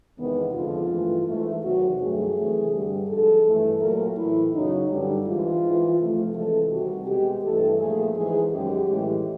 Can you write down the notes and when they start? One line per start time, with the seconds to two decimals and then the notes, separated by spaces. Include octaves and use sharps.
0.17 E2 C3 D#3 G#3 B3
0.54 F2 D3 F3 G#3 F4
0.90 G2 E3 A3
1.27 G#2 E3 A3
1.63 E2 C3 D#3 F#3 F#4
1.99 G2 D#3 F#3 A3 G#4
2.35 C3 E3 A3
2.72 G2 D3 G3
3.08 G#2 F3 G#3 A4
3.44 G2 E3 A3
3.80 A#2 F#3 A3 A#4
4.16 A2 E3 A3 E4
4.52 F#2 C#3 F#3 D#4
4.89 G2 D3 G3
5.25 G#2 E3 G#3 F4
5.61 G#2 E3 G#3
5.98 C3 F3 A3
6.34 C3 E3 G#3 A4
6.70 C3 D#3 G3 F#4
7.06 B2 G#3 G4
7.43 G2 E3 A3 A4
7.79 A#2 F3 A3 G#4
8.15 G#2 E3 G#3 G#4
8.52 F#2 D#3 G#3 G4
8.89 A2 E3 G#3